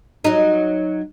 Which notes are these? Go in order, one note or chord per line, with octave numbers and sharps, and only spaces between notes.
F#3 D#4